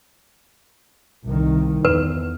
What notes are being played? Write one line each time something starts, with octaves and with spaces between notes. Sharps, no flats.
C2 D#3
E2 B4